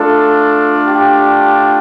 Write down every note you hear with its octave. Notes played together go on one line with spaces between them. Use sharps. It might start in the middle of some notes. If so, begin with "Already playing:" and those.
Already playing: A3 D4 F4 A4
G4